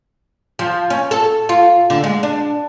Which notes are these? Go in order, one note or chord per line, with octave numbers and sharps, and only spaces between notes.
F3
C#4
A4
F4
D3
G#3
D4